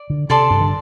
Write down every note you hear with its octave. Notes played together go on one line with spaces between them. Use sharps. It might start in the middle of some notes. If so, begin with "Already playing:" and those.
Already playing: D5
D3
C3 A4 D5 A5 C6
G2
D3